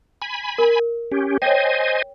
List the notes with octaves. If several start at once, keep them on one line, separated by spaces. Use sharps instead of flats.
G#5 B5
A#4
C#4 G4
C5 C#5 D#5 G5 G#5